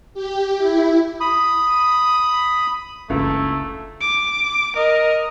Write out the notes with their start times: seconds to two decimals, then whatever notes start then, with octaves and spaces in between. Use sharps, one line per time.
0.14 G4
0.58 E4
1.20 B5 D#6
3.10 F#1 C#2 A3 D4
4.01 D6
4.76 A#4 D#5